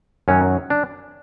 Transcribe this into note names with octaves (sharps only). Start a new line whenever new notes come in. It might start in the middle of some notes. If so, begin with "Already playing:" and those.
F#2 D#3 F#3 C#4
D4